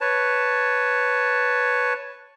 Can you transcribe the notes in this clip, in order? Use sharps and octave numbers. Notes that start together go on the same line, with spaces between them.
B4 C#5 A5